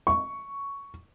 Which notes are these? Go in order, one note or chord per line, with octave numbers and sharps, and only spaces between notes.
C#6